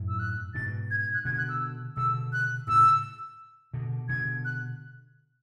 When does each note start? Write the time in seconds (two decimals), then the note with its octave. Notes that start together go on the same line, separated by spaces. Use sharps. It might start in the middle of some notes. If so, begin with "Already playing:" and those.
Already playing: F#2 A2
0.08 E6
0.19 F#6
0.54 G#2 B2 A6
0.91 G#6
1.02 G#6
1.14 F#6
1.25 B2 D3 G#6
1.38 F#6
1.49 E6
1.97 B2 D3 E6
2.33 F#6
2.67 A2 C#3 E6
3.74 B2 D3
4.09 B2 D3 G#6
4.45 F#6